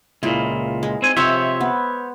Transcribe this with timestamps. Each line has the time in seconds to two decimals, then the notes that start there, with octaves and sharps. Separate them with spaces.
0.23 C#2 A#2 E4 F4
0.83 G#3
1.02 C4 G#5
1.17 C3 F3 C4 C5 C#5 E5
1.61 B3